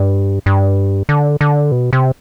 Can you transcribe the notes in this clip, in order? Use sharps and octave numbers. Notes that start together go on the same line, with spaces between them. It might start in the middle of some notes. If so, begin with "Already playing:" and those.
Already playing: G2
G2
D3
D3
B2
C3